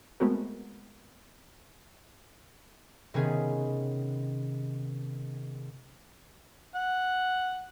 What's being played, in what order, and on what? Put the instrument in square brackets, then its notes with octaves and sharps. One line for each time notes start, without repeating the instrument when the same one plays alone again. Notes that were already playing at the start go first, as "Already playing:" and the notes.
[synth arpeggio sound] G#3 A3 B3 C4 F#4 A#4
[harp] C3 D#3 B3 C#4 G#4
[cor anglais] F#5